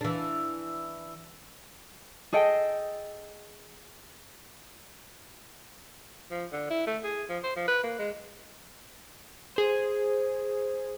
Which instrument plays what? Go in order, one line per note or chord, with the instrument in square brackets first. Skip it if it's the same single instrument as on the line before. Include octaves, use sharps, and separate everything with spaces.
[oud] E3 D4
[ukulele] G#4 A4 D#5 G5
[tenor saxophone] F3
D3
E4
A3
G#4
F3
C5
F3
B4
A#3
G#3
[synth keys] G#4 C5